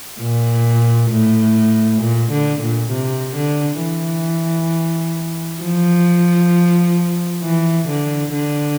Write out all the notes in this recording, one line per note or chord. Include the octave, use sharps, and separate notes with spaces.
A#2
A2
A#2
D3
A#2
C3
D3
E3
F3
E3
D3
D3